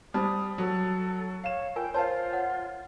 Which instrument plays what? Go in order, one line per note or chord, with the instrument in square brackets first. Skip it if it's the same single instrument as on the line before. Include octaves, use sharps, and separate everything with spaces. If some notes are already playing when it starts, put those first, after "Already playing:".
[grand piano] G3 [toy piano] D#4 C5 [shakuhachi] D#6
[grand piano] F#3 [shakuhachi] A4
[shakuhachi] C#5 [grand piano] F5 E7
[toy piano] F4 A#4 G#5 [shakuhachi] G5
[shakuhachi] F4 [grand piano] C5 F5 [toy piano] C#5 A5
[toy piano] C#5 F#5